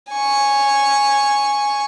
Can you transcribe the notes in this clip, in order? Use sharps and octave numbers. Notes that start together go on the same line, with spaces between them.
G#5 C#6